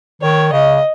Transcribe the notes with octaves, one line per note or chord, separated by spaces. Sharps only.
D#3 C#5
C#3 D#5